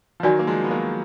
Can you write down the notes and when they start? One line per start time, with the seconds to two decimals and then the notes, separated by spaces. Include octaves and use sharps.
0.20 F3
0.23 D#3 F#3 F#4 D5 G#5
0.39 A#3
0.47 F3 G#3
0.64 B3
0.71 F#3 A#3